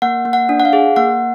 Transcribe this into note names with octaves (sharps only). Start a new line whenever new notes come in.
A#3 F#5
A#3
F#5
D4
F#5
F5
G#4
A#3 F#5